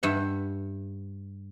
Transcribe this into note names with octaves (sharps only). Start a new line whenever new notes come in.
G2 E5 F#5